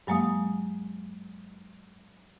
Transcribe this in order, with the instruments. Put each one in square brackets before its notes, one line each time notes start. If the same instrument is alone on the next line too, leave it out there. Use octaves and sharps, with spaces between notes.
[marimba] G2 F#3 G#3 A#3 F5 D#6